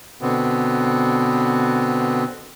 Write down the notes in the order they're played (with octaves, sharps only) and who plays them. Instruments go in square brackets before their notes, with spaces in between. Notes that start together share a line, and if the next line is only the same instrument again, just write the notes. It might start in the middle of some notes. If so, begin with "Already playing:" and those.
[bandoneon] B2 D3 B3 C4